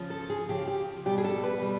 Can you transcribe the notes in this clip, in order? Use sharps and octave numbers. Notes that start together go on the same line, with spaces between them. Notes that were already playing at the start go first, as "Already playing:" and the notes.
Already playing: C#3 F3
A4
G#4
C#3 F3 G4
G4
B2 G3 G4
G#4
A4
B4
B2 G3